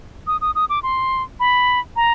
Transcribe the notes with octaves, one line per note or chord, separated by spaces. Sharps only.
D#6
D#6
D#6
D6
C6
B5
A#5